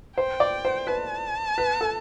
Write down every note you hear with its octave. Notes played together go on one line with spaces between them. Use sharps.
C5 G5
D5
C5
B4 A5
B4
A4